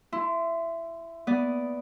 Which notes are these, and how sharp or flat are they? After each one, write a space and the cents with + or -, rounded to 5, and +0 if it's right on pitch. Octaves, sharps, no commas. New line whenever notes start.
E4 +15 C6 -15
B3 +0 D5 -10 D#6 +0